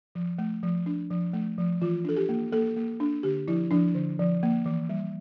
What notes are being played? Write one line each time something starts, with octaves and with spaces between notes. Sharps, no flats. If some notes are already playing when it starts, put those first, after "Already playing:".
F3
A3
F3
D4
F3
A3
F3
E3 F4
D4 A4
G4
A#3
A#3 A4
A#3
D4
D3 G4
F3 E4
F3 D4
D3
F3
A#3
E3
G3